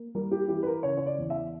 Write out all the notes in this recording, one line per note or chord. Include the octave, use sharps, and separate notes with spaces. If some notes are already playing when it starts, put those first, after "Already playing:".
Already playing: A#3
G3 A#4
G4
E3 G4
B4
A#4
C#3 C#5
C#5
D5
E2
E5